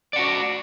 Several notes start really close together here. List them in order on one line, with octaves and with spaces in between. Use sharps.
D5 F#5 F#4